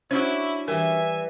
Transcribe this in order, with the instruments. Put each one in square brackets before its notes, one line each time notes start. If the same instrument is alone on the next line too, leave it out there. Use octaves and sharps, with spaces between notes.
[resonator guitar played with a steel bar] C#4 D4 F#4 [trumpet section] E4 [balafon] C5
[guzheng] E3 G3 [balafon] A#4 [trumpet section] E5 G#5